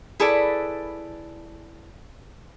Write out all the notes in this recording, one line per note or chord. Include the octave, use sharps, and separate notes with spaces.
E4 G#4 A4 B4 D5